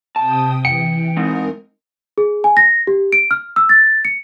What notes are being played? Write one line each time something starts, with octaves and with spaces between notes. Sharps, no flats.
C3 G5 A5 D#6
E3 G5 C#7
G#3 C4 D#4 A#4
G#4
G#5
A#6
G4
D7
F6
E6
A6
C#7